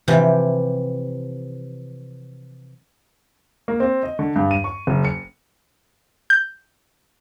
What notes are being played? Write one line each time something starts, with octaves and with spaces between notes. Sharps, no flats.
C3 E3 F3 G4
A#3
C4
D#5
D3
G2
D#7
C#6
F#1
C#7
G6